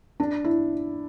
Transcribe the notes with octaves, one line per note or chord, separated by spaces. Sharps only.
D4
E4